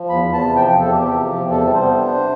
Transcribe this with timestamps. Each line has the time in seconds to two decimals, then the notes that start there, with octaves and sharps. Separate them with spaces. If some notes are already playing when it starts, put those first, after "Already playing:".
Already playing: F3
0.09 E2 B5
0.25 E2
0.33 A5
0.41 C3
0.56 F3 G5
0.72 E2
0.80 A4
0.88 E2 G4
1.04 C3
1.19 F3
1.35 E2
1.51 C3 A4
1.66 G3
1.74 C5
1.82 B3
1.98 D4
2.14 C3